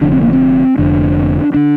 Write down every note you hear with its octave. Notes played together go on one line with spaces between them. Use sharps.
F1 F2 D3 D4
C4
A#3
C4
F1 F2 D3 D4
D3 D4